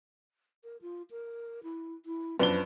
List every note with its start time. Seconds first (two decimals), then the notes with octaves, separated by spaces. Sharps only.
0.64 A#4
0.82 F4
1.11 A#4
1.63 E4
2.06 E4
2.39 F#2 F3 B3 D4 B4 G7